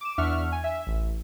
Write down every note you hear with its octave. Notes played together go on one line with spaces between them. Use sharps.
D6 E7
E2 D4 E5 F#5 C#6 F6
G#5
E5
A1